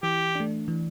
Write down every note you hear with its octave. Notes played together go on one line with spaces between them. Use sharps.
E3 G4
A3 D4
E3